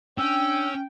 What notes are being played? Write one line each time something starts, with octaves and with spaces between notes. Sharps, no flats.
C#4 D4 G5 E6